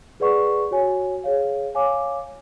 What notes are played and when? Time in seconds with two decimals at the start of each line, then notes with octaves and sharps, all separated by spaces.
0.20 G#4 B4 D5 F#5 C#6
0.71 F#4 C#5 G#5
1.24 G#4 C#5 F5
1.75 C#5 F5 G#5 D6